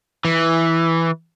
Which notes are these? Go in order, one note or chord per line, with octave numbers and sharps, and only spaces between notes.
E3